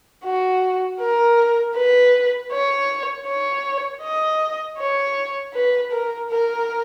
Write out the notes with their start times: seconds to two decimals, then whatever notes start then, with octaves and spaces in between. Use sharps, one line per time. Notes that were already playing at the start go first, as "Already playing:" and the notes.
0.24 F#4
1.00 A#4
1.76 B4
2.52 C#5
3.27 C#5
4.03 D#5
4.78 C#5
5.53 B4
5.92 A#4
6.30 A#4